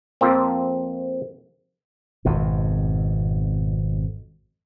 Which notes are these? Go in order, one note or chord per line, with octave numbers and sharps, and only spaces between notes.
F2 F3 A#3 C4
G#1 F2 B2